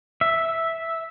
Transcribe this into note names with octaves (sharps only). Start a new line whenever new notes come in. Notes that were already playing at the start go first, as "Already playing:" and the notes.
E5